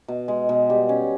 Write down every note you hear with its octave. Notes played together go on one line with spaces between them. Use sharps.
B2
G#3
B2
G3
C#4